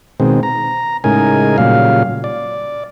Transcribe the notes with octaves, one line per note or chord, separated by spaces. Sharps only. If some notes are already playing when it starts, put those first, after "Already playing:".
B2 D#3 G#3 C4
A#5
A2 C#3 G#3 D#4 A#4 G#5
A#2 C#3 F#3 G3 F5
D5